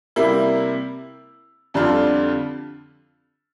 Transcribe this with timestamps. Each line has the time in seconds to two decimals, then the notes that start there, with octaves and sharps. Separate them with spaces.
0.16 C3 G3 A#3 E4
1.74 F2 D3 G3 D4 F4